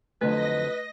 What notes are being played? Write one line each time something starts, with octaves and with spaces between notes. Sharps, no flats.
F2 D3 F#3 A3 B4 D#5 A#6